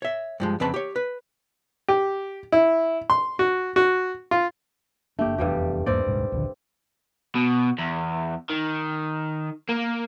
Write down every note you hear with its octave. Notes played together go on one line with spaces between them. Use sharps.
C#5 E5
G2 F3 G#3
F2 C#3 C4 B4 A5 B5
G4 C#5
B4
G4
E4
C6
F#4
F#4
F4
F#1 A3 A#3 D4 G4
F1 E2 G2 G3 G4
E2 G#2 G3 A#3 C4 D5
D#1 C2 G#2
A#1 D#2 D3
B2
E2
D#3
A#3